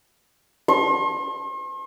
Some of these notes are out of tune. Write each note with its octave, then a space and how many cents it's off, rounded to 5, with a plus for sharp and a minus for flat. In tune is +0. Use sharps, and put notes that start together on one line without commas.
C6 +45